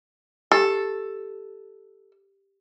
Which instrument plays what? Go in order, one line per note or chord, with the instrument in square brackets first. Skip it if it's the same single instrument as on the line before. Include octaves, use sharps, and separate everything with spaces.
[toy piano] G4 [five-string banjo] A4